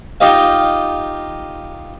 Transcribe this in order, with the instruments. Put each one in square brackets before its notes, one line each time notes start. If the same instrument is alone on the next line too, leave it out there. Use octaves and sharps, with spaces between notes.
[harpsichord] D#4 F4 G4 D#5 F5